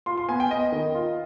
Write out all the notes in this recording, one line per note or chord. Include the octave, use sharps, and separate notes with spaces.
F4 C6
C6
B3 G#5
G5
B3 D#5
D#3
F4